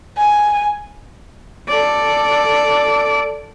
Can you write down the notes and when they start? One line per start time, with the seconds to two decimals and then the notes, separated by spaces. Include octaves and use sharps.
0.18 G#5
1.68 A4 D5